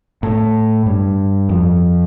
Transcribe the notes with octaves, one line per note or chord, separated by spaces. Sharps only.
A2
G2
F2